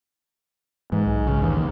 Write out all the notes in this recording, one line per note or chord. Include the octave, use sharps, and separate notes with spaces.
G#2 E3
B1
C#3
D#2 E3